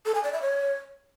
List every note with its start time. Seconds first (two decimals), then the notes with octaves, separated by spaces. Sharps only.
0.06 A4
0.15 G#5
0.24 D5
0.33 E5
0.42 C#5